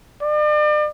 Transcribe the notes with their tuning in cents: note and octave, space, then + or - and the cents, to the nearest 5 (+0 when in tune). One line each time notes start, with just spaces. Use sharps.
D5 +40